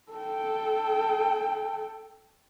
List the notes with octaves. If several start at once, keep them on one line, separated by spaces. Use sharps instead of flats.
A4 G5